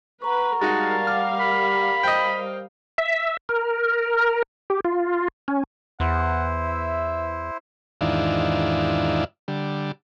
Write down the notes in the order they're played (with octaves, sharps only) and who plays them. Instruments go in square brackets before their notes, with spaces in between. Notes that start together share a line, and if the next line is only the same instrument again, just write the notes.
[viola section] B4 [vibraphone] F#5 A#5 C#6
[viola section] G3 A#4 F5 [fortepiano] G#3 D#4 F#4 [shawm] A5
[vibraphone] F#5 D6 [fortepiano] F6
[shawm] B5
[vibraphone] C5 [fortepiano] D#5 G5
[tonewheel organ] E5
A#4
G4
F4
C#4
[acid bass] E2 [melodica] E4 C5 [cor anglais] F#5
[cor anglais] E5
[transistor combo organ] E2 G#2 D#3 D4 E4 F4
D3 G3